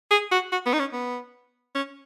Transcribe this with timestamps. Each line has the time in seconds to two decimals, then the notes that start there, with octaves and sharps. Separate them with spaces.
0.11 G#4
0.31 F#4
0.52 F#4
0.66 B3
0.74 D#4
0.79 C#4
0.93 B3
1.75 C#4